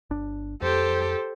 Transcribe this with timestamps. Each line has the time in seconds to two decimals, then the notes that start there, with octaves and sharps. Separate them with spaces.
0.10 G1 D4
0.62 F2 G4 A4 C5